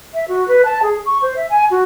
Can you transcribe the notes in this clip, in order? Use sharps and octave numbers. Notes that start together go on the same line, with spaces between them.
E5
F#4
B4
A5
G#4
C#6
C5
E5
G#5
F#4